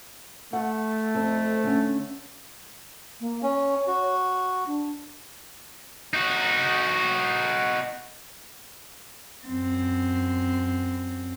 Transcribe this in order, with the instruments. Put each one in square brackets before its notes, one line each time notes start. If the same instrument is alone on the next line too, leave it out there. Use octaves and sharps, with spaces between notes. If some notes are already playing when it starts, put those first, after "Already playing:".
[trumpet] A3 [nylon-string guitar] F#5
[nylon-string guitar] F2 C4 A4
D3 C#4
[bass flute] A#3
[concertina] C#4 [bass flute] C#5
[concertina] F#4
[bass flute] D4
[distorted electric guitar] D#4 F#4
[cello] F#2 C4